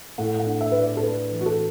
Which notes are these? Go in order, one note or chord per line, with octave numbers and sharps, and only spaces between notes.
A2 F#5
F#5
D4
E5
A2 B4
D5
A4
D4 B4
E3
F#4
A4